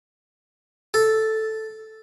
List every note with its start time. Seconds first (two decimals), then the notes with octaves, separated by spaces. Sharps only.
0.94 A4